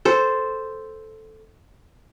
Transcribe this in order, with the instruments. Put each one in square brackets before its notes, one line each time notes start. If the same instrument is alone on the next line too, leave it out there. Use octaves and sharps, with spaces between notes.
[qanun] A4 C5